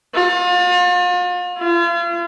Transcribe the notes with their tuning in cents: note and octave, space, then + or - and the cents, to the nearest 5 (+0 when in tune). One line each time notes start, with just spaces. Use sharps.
F4 +40
F4 -40